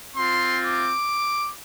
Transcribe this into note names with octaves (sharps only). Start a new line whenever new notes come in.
C4 F4 C6
D6